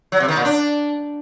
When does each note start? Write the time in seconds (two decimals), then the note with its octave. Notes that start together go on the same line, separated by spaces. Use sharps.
0.12 F#3
0.20 C3
0.28 D#3
0.37 A#2
0.45 D4